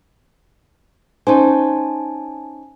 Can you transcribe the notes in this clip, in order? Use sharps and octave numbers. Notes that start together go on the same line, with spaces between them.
C#4 D#4 C5 G#5 A5